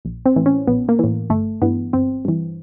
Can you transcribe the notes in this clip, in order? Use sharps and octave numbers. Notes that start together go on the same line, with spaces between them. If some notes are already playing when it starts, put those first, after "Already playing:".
A#1
C4
A2 E3
C#4
A#1 B3
A#3
A2 E3
G1 A3
G2 E3 B3
G1 C4
G2 E3